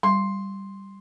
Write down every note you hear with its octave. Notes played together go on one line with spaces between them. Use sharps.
G3 C6